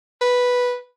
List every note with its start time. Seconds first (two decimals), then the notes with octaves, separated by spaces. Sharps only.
0.21 B4